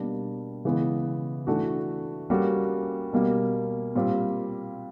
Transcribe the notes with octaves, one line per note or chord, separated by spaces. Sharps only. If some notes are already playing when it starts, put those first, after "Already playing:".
Already playing: B2 G3 A#3 D4
C#3 E3 G#3 B3
E3 A3 D4 F#4
G3 A#3 C#4 F#4 A4
B2 G3 A#3
A#2 G3 C4 F4